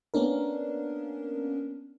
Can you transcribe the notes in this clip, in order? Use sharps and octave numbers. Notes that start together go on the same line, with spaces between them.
A#3 B3 C#4 D4 A#4